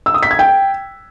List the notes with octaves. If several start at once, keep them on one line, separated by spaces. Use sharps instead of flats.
E6
D#6
B6
G#6
G5